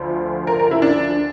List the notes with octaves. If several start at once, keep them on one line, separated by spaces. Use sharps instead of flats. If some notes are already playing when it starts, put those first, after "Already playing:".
Already playing: D2 D3 F3
A#4
A#4
E4
D4